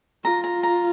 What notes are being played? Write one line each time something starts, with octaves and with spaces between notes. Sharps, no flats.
F4 A#5
A#5
A#5